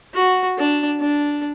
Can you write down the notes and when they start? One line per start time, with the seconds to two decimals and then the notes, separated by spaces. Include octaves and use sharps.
0.14 F#4
0.58 D4
1.01 D4